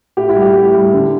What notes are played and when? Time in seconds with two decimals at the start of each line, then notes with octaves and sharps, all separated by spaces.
0.17 A2 G4
0.29 E4
0.36 G3
0.42 G4
0.56 A2
0.74 G3
0.93 D3